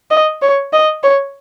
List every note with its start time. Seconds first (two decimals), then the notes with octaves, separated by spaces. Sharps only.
0.11 D#5
0.42 C#5
0.73 D#5
1.03 C#5